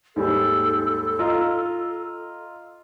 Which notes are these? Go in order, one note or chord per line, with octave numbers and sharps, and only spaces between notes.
D#2 G#2 G3 A4
F4 D#5 A#5